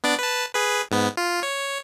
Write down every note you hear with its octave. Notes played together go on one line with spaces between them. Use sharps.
B3 D4 D5
B4 A5
G#4 B4
G#2 B3
F4
C#5